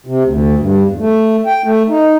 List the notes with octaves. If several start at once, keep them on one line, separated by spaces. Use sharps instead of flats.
C3
D2
G2
E2
A3
G5
A3
D#4